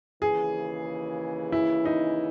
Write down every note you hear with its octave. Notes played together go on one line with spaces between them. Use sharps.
D#2 C#3 E3 G#4
E4
D#4